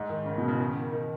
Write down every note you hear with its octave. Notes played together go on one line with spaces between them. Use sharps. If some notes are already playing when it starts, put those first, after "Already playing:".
Already playing: G#2
D#3
C#3
B2
C#3
D#3
D#3